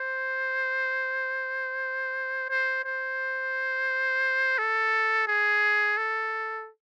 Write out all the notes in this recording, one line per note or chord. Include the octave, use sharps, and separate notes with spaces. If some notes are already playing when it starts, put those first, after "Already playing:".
Already playing: C5
C5
C5
A4
G#4
A4